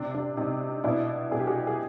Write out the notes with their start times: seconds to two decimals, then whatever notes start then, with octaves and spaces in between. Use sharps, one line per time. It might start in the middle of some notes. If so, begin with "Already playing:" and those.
Already playing: C3 D4
0.15 D4
0.37 C3 D#4
0.84 B2 D4 E4
1.31 B2 G#4
1.40 G4
1.47 F#4 G#4
1.67 G#4